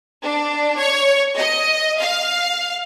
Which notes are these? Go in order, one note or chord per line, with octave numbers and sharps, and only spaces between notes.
D4
C#5
D#5
F5